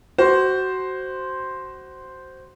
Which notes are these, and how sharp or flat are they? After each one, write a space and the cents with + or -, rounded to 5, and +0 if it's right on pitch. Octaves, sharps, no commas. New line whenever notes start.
F#4 +20 C5 +0